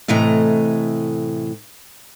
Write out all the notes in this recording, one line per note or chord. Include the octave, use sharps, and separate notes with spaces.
A2 C3 E3 A3 D#5 A#5